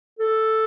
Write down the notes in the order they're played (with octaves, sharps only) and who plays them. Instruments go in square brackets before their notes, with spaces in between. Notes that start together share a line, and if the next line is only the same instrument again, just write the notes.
[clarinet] A4